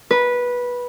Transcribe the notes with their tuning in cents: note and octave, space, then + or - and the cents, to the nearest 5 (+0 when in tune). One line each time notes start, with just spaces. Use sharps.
B4 -15